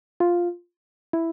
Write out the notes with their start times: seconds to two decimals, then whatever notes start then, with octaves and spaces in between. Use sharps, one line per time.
0.20 F4
1.13 E4